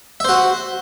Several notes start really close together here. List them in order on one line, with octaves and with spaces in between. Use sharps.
E5 C5 F#4